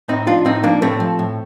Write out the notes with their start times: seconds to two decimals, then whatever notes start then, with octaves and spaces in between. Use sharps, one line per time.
0.08 A2 C4 D#4
0.27 F3 D4 F4
0.45 A2 C4 D#4
0.63 F3 A#3 D4
0.82 A2 A3 C4
1.00 F3
1.19 A2